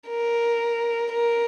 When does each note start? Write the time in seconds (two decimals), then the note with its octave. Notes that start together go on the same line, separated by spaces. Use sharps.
0.08 A#4
1.12 A#4